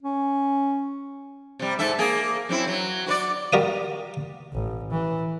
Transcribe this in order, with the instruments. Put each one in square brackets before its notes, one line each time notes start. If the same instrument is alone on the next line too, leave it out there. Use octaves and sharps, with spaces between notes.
[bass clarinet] C#4
[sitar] C3 G3
G#2 A4 E5
A#3 G#4
F#2 C4 E4
F#3
F#4 B4 D5
[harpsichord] G3 F#4 A#4 D5 F5 D#6
[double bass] A1
E3